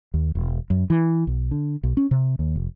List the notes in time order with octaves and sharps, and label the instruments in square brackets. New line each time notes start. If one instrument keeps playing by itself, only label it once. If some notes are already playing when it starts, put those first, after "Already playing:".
[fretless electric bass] D#2
E1
F#2
E3
B1
D3
B1
C#4
C3
D#2
F1